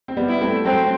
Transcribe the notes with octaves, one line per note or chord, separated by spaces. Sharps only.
C4
G3 B3
E4
A3 C4
F#3 A3 C4